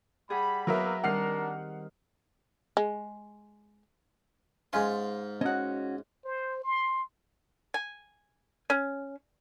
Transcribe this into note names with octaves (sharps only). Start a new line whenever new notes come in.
G3 G#4 F#5 B5
F#3 A#3 B3 A#4 B4 E5
D#3 G3 C4 D4 A#4 F#5 F6 C7
G#3
G#2 C#4 F4 F5
C#4 F#4 D#5 F#5
C5
C6
G#5
C#4